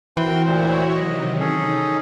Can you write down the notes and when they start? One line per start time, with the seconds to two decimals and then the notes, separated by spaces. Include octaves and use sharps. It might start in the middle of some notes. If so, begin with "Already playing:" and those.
0.17 E3 C4 F#4 A#4 G5 C6
0.46 D2 A#2 E4 F#4 C5 C#5
0.95 C3 D#3 F#3 D#5
1.40 C#4 D#4 G#4 A4